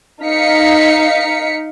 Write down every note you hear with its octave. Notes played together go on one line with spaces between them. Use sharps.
D#4 F5 B6 C#7